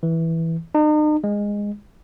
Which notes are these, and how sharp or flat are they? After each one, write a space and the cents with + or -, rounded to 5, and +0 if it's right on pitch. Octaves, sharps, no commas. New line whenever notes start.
E3 -5
D#4 -40
G#3 -15